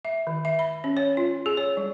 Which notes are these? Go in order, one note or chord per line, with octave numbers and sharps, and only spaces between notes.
E5
D#3
E5
B5
C#4
C#5
F4
G#4
C#5
G3